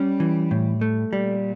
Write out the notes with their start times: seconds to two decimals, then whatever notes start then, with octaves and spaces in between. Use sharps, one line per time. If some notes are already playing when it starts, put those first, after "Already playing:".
Already playing: G3 C#4
0.20 E3
0.51 A2
0.81 A3
1.12 A#2 G3